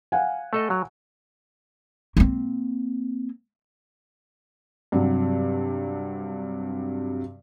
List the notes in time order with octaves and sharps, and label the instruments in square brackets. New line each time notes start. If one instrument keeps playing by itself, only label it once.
[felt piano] F5 F#5 G#5
[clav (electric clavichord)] A3 A4 D#5
F#3
[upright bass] A#3 C4
[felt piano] G2 C3 F#3